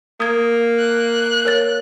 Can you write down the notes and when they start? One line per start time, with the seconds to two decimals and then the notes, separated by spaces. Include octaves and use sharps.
0.20 A#3 D#6 G#6
0.79 F#6
1.45 A#4 C#5 A6